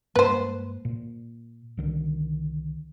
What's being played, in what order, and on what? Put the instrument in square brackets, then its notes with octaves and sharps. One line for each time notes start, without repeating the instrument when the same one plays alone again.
[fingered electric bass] G2 G#3 A#3 [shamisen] B4 C5
[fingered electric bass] A#2
C2 D3 D#3